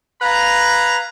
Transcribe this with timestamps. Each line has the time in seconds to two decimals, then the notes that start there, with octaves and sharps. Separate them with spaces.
0.22 B4 F5 G#5 A#5